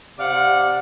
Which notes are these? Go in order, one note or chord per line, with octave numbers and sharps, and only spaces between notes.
C3 D5 F5 F#5